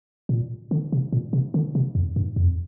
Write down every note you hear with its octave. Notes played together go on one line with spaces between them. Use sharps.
A#2
D3
C3
A#2
C3
D3
C3
F2
G2
F2